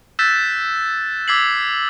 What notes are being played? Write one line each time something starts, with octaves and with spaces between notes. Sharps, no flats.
E6 F#6 G6 A6 B6 E7
D6 E6 G#6 B6 C7 F#7